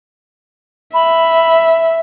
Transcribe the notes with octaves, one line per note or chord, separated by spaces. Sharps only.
E5 B5